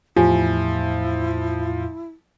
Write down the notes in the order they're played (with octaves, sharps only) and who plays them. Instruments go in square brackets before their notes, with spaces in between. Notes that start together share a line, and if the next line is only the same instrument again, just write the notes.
[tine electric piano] E2 A2 [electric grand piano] F3 [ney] E4 [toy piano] F4 G4 G#5